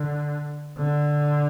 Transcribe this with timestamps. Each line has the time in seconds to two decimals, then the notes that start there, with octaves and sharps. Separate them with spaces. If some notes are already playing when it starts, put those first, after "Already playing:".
Already playing: D3
0.78 D3